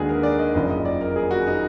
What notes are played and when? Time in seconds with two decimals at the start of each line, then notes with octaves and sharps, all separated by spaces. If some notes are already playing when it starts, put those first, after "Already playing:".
Already playing: D#2 D3 G#3 D#4 F#4 G#4 B4 D5
0.09 A#4
0.23 D5
0.39 D#5
0.54 F#1 F2 F3 D#5
0.70 D#5
0.85 D5
1.01 A#4
1.16 G#4
1.31 F#4
1.47 D#4